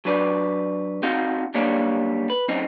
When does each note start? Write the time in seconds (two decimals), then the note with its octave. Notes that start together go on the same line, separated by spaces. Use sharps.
0.05 F#3 D4 B4 D5
1.03 C4 D#4 F#4 F5
1.54 F#2 G3 A#3 D4 C#5 F5
2.30 B4
2.48 F#2 C4 C#4 D#4